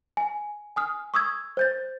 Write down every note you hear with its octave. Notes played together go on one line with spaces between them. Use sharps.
G#5
G#5 D#6 F6
C#6 D#6 E6 G#6
C5 G6 A6